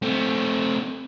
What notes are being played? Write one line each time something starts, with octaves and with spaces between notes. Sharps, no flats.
A3 C4